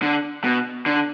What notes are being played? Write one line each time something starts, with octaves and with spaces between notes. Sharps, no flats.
D3
B2
D3